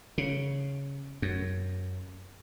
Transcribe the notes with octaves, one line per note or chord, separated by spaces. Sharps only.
C#3
F#2